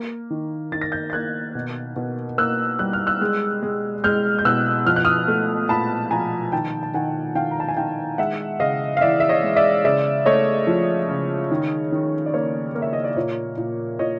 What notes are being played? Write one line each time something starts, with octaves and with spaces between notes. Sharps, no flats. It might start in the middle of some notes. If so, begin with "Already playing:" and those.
Already playing: A#3
D#3
D#3 A6
A#6
G6 A6
A6
A#3 F#6 G#6
B2
B2
A#3 E6 F#6
G3 F#6
F6
E6 F#6
G#3
G#3
G#3 F6 G6
G6
B2 E6 F#6
F3 F6
F#6
D#6 F6
A3
A#2 A5 B5
F3 G#5 A#5
D#3 G5 A5
A5
D#3 F#5 G#5
D#3 F5 G5
A#5
A5
G#5
D#3 F5 G5
G#3 E5 F#5
C#3 D#5 F5
F5
E3 D5 E5
E5
C#5 D#5
G#3
D5 E5
C#3 D5 E5
A3 C#5 D#5
F3
C#3
D#3
D#3
D5
A#3 C#5
A#3
E5
D#5
D5
A#2 C#5
A#2
A#2 C#5 D#5